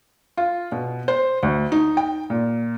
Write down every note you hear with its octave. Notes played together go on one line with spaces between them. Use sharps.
F4
B2
C5
D2
D#4
G5
A#2